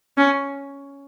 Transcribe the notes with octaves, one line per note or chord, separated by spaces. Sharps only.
C#4